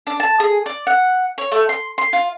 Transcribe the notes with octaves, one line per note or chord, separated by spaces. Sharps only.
D4
A5
G#4
D5
F#5
C#5
A3
C6
C6
F4